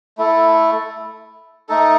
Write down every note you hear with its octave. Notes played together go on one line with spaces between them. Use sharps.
A3 E4 A4
A3 D#4 A4